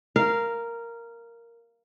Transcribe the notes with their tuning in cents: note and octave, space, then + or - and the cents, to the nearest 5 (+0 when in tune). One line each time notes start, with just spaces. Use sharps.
A#4 +0 F5 -15